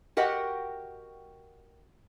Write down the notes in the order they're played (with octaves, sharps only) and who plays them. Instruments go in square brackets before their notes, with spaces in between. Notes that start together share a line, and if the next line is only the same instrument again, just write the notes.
[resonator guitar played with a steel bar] F#4 G4 A#4 D#5 F#5 G5